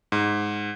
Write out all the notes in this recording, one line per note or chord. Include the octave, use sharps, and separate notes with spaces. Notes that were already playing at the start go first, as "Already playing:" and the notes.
G#2